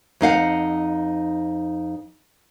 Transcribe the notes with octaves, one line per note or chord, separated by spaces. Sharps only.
F2 D#4 F5 F#5